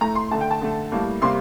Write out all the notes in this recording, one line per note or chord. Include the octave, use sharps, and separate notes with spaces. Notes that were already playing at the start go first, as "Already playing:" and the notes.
A2 A3 A#5
C6
D3 A3 A5
G5
A5
D3 A3
A2 G3 A#3
C3 G3 A#3 C6